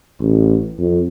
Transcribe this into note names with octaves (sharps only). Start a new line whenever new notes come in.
A1
F2